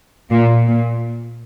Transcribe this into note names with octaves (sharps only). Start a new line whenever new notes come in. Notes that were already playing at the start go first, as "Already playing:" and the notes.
A#2
A#2